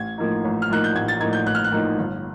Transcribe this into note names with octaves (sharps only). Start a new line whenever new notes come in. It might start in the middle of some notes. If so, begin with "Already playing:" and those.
Already playing: A1 G#6
A2 F3 A#3 D#4
A1
F6
A2 F3 A#3 D#4 F#6
G6
A1 G#6
A6
A2 F3 A#3 D#4 G#6
G6
A1 F#6
F6
F#6
A2 F3 A#3 D#4
G1